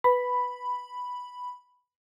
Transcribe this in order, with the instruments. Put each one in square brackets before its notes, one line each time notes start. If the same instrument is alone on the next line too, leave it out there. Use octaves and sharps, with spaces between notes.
[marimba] B4 [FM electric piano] B5